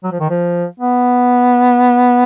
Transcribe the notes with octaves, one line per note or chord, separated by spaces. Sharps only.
F#3
F3
D#3
F3
B3